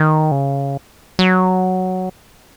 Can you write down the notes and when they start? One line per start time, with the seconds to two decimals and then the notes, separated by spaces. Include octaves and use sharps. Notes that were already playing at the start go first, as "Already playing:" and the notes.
Already playing: D#3
0.31 C#3
1.19 F#3